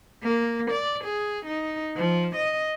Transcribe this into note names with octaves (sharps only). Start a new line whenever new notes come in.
A#3
D5
G#4
D#4
F3
D#5